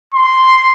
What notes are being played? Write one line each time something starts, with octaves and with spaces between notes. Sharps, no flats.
C6